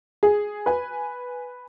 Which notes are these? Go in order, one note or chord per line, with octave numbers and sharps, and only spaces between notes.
G#4
B4 G#5